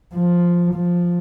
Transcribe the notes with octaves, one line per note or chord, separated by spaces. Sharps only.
F3
F3